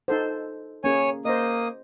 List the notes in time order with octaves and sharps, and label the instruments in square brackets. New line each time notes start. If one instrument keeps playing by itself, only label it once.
[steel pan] D#4 A4 C5
[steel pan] A#3 C#4 G#4 [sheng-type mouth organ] C#5 G#5
[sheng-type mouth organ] A#3 D#6 [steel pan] C5 D#5